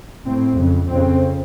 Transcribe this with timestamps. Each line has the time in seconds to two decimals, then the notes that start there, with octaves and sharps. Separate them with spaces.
0.25 A2 C4
0.57 F2 C#3
0.89 F2 C#3 C4